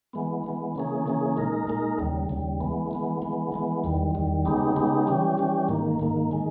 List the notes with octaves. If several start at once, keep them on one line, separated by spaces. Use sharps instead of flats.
E3 G#3 B3
E3 G#3 B3
C#3 E3 A#3 C#4 G#4
C#3 E3 A#3 C#4 G#4
A#2 G#3 D#4 A#4
A#2 G#3 D#4 A#4
D#2 C#3 G3
D#2 C#3 G3
E3 G#3 B3
E3 G#3 B3
E3 G#3 B3
E3 G#3 B3
E2 D#3 G3
E2 D#3 G3
C#3 G#3 B3 D#4 G4
C#3 G#3 B3 D#4 G4
E3 G3 C#4 G4
E3 G3 C#4 G4
G#2 D#3 A#3
G#2 D#3 A#3
D#3 G#3